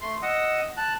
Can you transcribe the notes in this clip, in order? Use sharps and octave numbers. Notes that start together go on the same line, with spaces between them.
A3 C6
D#5 F#5 D#6 E6
A5 F#6